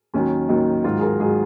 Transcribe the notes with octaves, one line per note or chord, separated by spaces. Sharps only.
D#2 D#3 F#3 C#4
D#2 D#3 F#3 D#4
G#2 D#3 F#3 F4
G#4
A#4
G#2 D#3 F#3 G#4